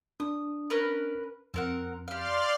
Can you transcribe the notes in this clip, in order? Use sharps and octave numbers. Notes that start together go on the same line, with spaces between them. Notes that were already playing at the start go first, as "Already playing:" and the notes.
D4 D#6
C#4 A#4 B4
F2 C4 A#4 F#5
G4 D5 F5 C6 F6